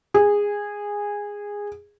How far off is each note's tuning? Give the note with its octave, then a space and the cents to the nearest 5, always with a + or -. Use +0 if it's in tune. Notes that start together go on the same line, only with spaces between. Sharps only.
G#4 -15